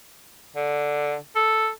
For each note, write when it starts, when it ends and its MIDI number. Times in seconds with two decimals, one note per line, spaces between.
0.56 1.16 50
1.35 1.70 69